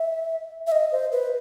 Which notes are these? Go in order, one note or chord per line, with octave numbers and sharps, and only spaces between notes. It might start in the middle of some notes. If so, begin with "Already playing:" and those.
Already playing: E5
E5
D#5
C5
B4